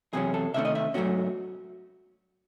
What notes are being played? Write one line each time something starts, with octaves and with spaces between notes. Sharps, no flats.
E2 C3 F#3 C#4 G#4
A4
C3 D#3 A3 C#4 E5
D#5
E5
G#2 F#3 A3 C#4 F#4